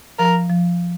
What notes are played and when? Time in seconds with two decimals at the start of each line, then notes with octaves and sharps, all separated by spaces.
0.19 F3 A#4
0.50 F3